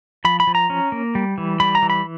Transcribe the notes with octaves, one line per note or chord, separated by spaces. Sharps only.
F3 B5
B5
F3
A#5
C#4
A#3
G3
E3
G3 B5
A#5
E3
B5